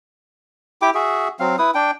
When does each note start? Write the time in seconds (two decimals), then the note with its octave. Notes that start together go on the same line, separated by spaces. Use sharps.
0.82 E4 G4 G5 D6
0.94 F#4 G#4 E5
1.40 F#3 C4 F5
1.58 E4 B4 D#6
1.75 D4 G5